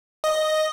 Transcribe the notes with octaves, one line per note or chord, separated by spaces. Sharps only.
D#5